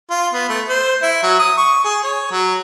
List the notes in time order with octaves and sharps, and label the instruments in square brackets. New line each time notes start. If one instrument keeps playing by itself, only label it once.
[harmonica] F4
B3
A3
C5
E4
F#3
D#6
C#6
G#4
C#5
F#3